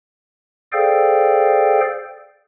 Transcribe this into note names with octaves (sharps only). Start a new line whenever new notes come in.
G#4 A4 C5 D5 F5 G5